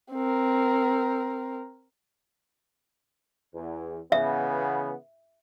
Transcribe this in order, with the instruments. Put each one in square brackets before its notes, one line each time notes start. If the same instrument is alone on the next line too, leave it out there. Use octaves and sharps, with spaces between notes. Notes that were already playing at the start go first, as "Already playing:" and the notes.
[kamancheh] C4 A#4
[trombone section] E2
[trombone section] C#3 E3 B3 [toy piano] E5